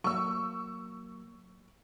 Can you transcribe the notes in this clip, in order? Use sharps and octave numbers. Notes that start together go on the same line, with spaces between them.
F#3 A#3 C#6 E6